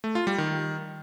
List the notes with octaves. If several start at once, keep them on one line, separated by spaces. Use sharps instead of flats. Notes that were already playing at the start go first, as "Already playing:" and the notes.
A3
F4
G3
D#3